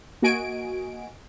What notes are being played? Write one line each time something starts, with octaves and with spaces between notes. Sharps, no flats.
A#3 F#4 D#5 G#5 D7